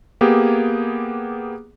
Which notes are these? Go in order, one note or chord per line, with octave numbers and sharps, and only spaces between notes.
A#3 B3 G4 G#4